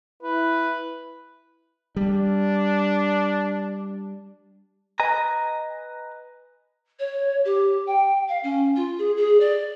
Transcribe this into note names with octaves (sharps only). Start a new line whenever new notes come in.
E4 B4
G3 D4
B4 D#5 G#5 A#5
C#5
G4
G5
F5
C#4
F4
G#4
G#4
D5